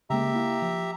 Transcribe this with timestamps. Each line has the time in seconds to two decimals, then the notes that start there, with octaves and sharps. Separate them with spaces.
0.10 C#3 G#3 A#3 G4 E5 A#5
0.34 A#3 E4 F5
0.62 F3